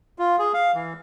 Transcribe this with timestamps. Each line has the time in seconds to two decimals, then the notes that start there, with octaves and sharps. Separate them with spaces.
0.19 F4
0.39 G#4
0.54 F5
0.75 E3